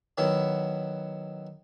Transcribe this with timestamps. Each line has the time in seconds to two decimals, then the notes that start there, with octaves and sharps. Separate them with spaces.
0.18 D#3 F#3 B3 E4